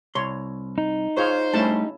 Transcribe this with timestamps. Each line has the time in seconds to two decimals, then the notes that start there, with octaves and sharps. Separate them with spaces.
0.15 C2 C#5 C6
0.78 D#4
1.17 F4 G#4 C5 C#5
1.53 G3 A3 C#4 D4 E4 A5